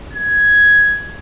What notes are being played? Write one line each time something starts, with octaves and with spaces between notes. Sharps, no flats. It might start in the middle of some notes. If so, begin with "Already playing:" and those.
G#6